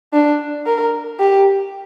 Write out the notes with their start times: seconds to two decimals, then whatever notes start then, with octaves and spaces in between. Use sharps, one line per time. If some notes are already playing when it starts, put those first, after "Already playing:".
0.13 D4
0.66 A#4
1.20 G4